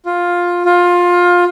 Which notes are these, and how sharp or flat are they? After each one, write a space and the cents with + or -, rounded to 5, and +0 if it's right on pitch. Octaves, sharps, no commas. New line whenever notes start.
F4 +10
F4 +20